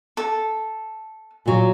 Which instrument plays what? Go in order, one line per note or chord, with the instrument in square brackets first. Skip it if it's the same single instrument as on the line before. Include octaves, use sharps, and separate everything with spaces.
[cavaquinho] A4
[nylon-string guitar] A#2 F#3